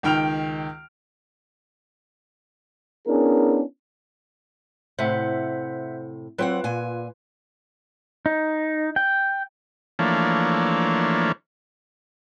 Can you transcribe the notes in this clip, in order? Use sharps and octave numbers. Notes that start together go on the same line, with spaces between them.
C#2 D#3 G5 F6 D7 F7
B3 C#4 D4 E4 G#4 A#4
A2 C3 C5 E5 F#5
F#3 C4 F4 B4 F#5
A#2 G#5
D#4
G5
E3 F3 A3 A#3 D4 C#5